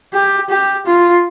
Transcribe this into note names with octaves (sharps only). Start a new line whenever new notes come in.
G4
G4
F4